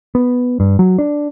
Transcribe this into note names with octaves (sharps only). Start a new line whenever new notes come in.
B3
G2
F#3
D4